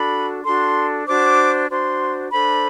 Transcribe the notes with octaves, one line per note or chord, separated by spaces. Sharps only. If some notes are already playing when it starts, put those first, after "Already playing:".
Already playing: D4 F#4 A4 B5
D4 F#4 A4 C6
D4 F#4 C5 D6
D4 F#4 C5 C6
D4 A4 C5 B5